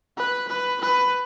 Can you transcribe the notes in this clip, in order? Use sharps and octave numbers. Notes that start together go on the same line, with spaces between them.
B4
B4
B4